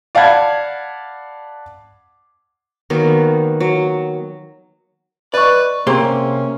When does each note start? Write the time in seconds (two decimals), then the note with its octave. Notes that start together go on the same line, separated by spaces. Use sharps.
0.15 D5 F5 F#5 A5 B5 G#6
2.90 D#3 F#3 A#3 B3
3.60 F#3
5.34 B4 D5 D#5 C#6
5.87 C3 A#3 C#4 G4 G#4 C5 C6